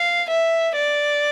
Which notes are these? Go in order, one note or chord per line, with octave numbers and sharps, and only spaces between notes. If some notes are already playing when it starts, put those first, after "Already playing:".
Already playing: F5
E5
D5